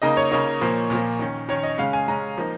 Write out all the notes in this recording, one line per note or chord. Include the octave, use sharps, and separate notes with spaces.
C#3 A#3 D#4 D#5
C#5
C#3 A#3 D#4 C#5
A#2 F3 A#3
A#2 F3 A#3
D#3 C#4
D#3 C#4 C#5
D#5
C#3 G#3 C#4 F5
G#5
C#3 G#3 C#4 A#5
F3 A#3 D#4